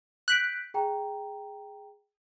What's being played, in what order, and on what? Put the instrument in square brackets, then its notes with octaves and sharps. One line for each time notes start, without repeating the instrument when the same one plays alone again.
[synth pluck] F#6 [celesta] G6 B6 D7
[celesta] G#4 G5 A#5